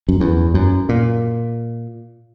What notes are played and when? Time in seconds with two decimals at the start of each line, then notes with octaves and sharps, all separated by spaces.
0.08 F#2
0.20 E2
0.54 F#2
0.89 A#2